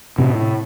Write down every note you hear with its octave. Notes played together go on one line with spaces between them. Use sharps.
A2 C3 C4